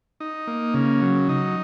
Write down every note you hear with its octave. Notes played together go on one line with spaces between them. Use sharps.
D#4
A#3
C#3
F#3
D#4